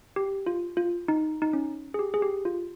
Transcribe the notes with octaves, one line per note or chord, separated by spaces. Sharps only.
G4
F4
F4
D#4
D#4
C#4
G#4
G4
G#4
G4
F4